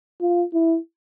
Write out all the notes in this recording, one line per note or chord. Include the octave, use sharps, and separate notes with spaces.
F4
E4